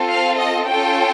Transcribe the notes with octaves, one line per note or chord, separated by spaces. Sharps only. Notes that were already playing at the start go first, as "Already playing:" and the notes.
Already playing: C4 F4 A4
F5
D#5
C#4 F4 A4 G5